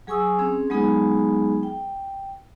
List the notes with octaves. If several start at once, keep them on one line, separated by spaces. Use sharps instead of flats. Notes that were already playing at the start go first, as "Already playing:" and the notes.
F#3 G#4 G#5 C#6 D#6 E6
C4 C#4 G#4
F#3 G#3 B3 D#4 G#4
G5